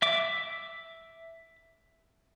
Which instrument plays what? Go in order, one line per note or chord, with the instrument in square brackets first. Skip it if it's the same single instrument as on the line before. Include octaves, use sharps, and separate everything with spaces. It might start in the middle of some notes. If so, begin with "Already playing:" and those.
[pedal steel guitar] E5 D6